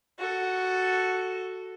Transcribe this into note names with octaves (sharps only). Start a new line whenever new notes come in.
F#4 A4